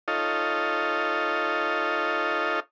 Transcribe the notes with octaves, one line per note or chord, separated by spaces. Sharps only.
D#4 F4 A4 C#5 D#5 F5